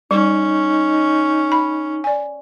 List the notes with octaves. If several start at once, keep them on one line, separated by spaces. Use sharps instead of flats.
G3 C#4 D#4
B5
D5 G#5